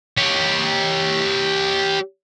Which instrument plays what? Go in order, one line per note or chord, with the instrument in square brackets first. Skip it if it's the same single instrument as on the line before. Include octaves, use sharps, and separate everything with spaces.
[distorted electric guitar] G4 C#5